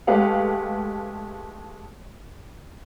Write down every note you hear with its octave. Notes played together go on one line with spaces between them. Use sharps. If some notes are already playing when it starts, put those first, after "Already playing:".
G#3 A3 G4 B4 F5 F#5